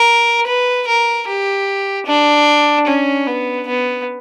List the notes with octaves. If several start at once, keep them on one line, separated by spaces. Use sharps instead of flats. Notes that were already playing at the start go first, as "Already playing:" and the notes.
Already playing: A#4
B4
A#4
G4
D4
C#4
B3
B3